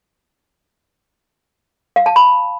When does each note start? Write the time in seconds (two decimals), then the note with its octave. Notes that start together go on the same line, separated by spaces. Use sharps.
1.96 F5
2.06 A5
2.16 B5